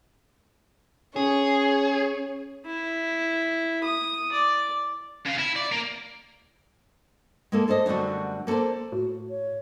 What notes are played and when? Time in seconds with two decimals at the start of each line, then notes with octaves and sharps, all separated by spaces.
1.16 C#4 G#4 C#5
2.66 E4
3.84 D#6
4.32 D5
5.26 C#3 F5
5.39 E4
5.56 D5
5.72 A#3
7.52 G#3 A#3 A4
7.68 A4 C5 D5 D#5
7.86 F#2 D3 G3 A3 F#4
8.47 A#3 A4 B4 C5 D5
8.92 A2 F#4
9.30 C#5